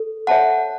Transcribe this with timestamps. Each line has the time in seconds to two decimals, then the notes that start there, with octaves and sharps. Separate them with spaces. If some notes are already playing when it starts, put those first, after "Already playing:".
Already playing: A4
0.27 C#5 E5 F#5 A5